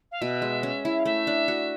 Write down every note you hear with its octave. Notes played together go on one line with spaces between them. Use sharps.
F5
B2 E5
G#3
C#4
E4
F5
A3 E5
D4
F#4